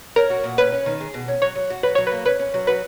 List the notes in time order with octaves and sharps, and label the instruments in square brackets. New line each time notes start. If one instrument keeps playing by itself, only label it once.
[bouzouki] C#4 [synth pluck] A#4
[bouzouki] F#4
A#2
[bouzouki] C#4 [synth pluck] B4
[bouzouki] C#4
D#3
G#4
B2
C#4
[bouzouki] F#3 [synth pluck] C#5
[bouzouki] F#3
F#4
[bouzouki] F#3 [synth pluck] B4
[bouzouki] F#3 [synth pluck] C#5
[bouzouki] A#3 [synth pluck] B4
[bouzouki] C#4 [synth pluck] B4
[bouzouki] C#4
F#3
[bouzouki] F#4 [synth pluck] B4